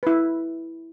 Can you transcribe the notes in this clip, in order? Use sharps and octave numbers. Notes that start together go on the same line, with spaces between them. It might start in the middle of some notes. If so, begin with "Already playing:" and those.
E4 B4